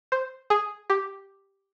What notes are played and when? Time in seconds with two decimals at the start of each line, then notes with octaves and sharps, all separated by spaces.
0.12 C5
0.50 G#4
0.90 G4